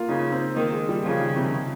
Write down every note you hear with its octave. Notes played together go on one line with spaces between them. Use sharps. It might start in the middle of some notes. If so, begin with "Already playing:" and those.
Already playing: A#3 F4
C#3 D#4
C4
D#3 A#3
G#3
G3
C#3 F3
D#3
C3
C#3